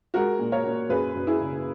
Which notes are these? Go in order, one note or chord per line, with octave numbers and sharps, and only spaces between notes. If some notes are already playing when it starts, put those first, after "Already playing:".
G#3 F#4 A#4
A#2
A#4 C#5
A#2
F#2 G#4 B4
F#2
E4 G#4
C#3